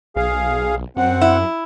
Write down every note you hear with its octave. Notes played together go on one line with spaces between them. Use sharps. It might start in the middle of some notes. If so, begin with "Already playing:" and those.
B1 G#4 F5
F#2 C4 F#5
E4